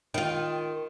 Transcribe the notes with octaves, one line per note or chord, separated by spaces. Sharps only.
D#3 F4